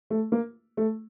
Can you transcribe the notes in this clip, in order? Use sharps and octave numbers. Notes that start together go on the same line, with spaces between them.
A3
A#3
A3